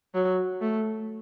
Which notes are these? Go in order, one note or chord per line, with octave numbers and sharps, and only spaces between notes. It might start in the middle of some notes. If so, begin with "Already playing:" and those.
F#3
A3